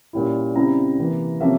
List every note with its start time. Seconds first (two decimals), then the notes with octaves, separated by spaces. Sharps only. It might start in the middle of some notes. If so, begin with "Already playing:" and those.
0.13 A#2 G3 C#4 E4
0.55 C#3 G3 C4 E4 A#5
0.98 C3 E3 A#3
1.40 C3 F3 A#3 C#4 E5